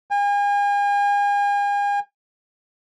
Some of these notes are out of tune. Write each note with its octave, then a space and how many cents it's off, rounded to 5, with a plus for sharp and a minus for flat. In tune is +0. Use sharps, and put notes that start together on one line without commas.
G#5 -40